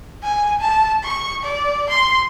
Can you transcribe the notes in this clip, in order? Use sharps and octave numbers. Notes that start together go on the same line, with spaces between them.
G#5
A5
C#6
D5
C6